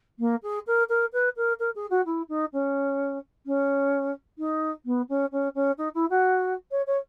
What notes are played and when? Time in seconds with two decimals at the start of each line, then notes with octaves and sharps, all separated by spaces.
0.19 A#3
0.42 G#4
0.66 A#4
0.89 A#4
1.12 B4
1.36 A#4
1.59 A#4
1.75 G#4
1.90 F#4
2.05 E4
2.28 D#4
2.53 C#4
3.46 C#4
4.38 D#4
4.85 B3
5.09 C#4
5.32 C#4
5.55 C#4
5.77 D#4
5.94 E4
6.09 F#4
6.71 C#5
6.86 C#5